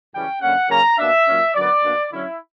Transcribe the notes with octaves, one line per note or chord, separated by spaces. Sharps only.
F#2 C#3 E3 G3 C#4 G5
F#2 D3 A#3 C#4 F#5
C#3 F#3 A#3 C#4 A#5
B2 A#3 D4 E5
A#2 F#3 C#4
F#2 D3 F#3 B3 D5
B2 A#3 D4
D3 F#3 C#4 E4